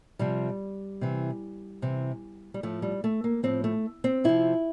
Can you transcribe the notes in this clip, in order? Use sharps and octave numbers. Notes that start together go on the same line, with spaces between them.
C3 F3 G3
C3 E3
C3 E3
G3
A2 F3 A3
G3
A3
A#3
A2 F3 C4
A3
C4
C3 F3 E4